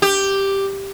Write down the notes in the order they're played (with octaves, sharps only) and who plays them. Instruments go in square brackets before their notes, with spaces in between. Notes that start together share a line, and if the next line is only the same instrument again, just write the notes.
[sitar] G4